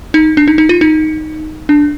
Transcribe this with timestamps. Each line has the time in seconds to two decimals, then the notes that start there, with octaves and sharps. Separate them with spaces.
0.14 D#4
0.37 D4
0.48 D#4
0.58 D#4
0.69 F4
0.81 D#4
1.69 D4